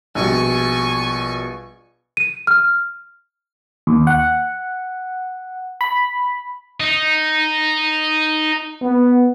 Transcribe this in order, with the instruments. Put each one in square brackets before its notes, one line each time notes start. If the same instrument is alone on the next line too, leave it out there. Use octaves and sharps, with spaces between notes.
[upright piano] A#1 B2 G3 [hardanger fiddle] G#5 C#6
[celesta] D#7
F6
[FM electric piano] D#2
F#5
B5
[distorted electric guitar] D#4
[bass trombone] B3